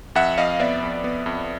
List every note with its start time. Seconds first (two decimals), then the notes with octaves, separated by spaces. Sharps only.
0.15 F2 E5 F#5
0.38 F2 D#5 F5
0.60 B3 D5 E5
0.83 F2
1.04 B3
1.26 F2